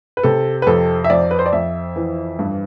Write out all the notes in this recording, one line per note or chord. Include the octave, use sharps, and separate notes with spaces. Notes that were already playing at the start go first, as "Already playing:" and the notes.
B4
C3 A4
B4
F2 A4
E5
F2 D5
B4
C5
D5
F2 E5
E3
G2